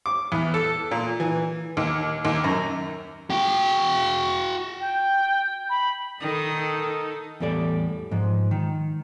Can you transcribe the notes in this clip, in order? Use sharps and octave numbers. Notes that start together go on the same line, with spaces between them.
D6
E2
A4
A#2
E3
D#2
D#2
F#2
F#4 G5
G5
B5
D#3 D#4 A4
E2 A2 G3 A4 D5
G#2 F3
D#3